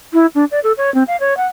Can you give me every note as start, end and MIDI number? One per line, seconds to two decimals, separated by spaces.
0.13 0.26 64
0.35 0.44 62
0.51 0.59 74
0.63 0.72 69
0.77 0.92 73
0.94 1.03 60
1.07 1.16 77
1.20 1.36 73
1.37 1.45 78